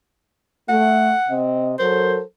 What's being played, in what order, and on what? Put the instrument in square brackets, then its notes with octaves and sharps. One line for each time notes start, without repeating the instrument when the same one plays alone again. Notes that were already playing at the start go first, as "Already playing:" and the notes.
[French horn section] A3 [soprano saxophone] F#5
[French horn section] C3 C4 D#5
[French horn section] F#3 A4 A#4 [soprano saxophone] C5